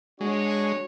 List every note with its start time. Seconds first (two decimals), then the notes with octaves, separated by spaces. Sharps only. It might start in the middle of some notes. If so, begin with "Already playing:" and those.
0.21 G#3 D4 F#4 C#5